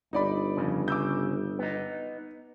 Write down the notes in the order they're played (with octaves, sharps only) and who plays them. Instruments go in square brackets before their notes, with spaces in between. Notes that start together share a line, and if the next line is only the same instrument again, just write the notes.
[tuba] G1 [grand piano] D#4 D5 B5
[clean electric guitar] F2 A#2 C#3
[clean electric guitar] C#3 [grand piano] D6 E6 G6
[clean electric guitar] B3 D#4